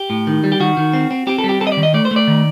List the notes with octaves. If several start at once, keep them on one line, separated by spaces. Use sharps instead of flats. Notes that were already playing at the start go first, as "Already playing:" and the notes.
Already playing: G4
A2
D#3
G3
G4
D#3 F#4
D#3
C4
C4
C4 G4
A4
G3
G4
C4 A4
D#5
D5
D#3
D#5
A3 D5
C5
A3
D5
D#3